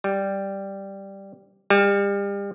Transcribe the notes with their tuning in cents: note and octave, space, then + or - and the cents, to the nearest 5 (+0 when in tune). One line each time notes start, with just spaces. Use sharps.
G3 +0
G3 +35